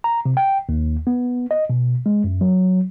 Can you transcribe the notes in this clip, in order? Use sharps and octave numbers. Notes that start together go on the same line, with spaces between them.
A#5
C3
G5
D#2
B3
D#5
B2
G#3
F#2
F#3